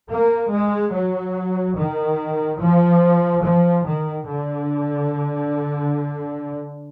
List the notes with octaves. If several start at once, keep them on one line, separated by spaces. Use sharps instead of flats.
A#3
G#3
F#3
D#3
F3
F3
D#3
D3